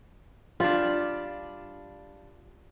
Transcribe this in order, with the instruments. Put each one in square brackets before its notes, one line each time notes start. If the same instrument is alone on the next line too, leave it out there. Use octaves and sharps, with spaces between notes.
[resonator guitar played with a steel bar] G3 D4 [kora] F4